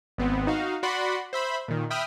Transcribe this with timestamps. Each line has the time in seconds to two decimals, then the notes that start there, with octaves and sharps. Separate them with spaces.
0.18 G#1 B3 C4
0.47 D#4 F#4 F5
0.83 F#4 D5 F#5 B5 C6
1.33 C5 E5 B5
1.68 A#2 D#3
1.90 E5 G5 B5 D#6 F6